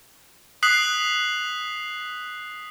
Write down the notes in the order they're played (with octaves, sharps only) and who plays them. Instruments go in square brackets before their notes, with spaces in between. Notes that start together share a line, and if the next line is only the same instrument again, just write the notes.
[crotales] D#6 F#6 B6 C7 F#7